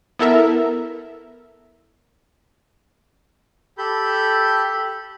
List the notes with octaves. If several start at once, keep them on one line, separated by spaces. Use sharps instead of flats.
B3 E4 A4 A#4 E5
G4 A4 B5 G6